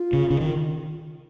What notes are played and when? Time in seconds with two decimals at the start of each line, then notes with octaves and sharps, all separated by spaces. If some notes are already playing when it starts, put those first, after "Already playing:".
Already playing: F4
0.13 C#3
0.31 C#3
0.40 D#3